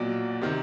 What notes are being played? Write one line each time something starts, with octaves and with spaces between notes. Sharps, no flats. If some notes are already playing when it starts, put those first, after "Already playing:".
Already playing: B1 A#2 F#3 D5
C3 D#3